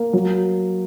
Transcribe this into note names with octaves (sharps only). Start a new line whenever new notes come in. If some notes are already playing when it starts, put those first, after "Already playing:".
Already playing: A#3
F#3